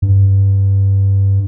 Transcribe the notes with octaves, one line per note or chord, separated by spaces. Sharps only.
G2